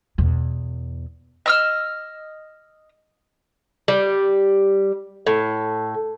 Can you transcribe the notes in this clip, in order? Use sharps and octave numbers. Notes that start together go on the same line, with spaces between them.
E2 B2
D#5 E6 F6
G3
A2